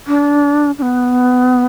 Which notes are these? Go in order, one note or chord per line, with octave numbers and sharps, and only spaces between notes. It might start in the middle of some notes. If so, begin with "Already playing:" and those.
D4
D4
B3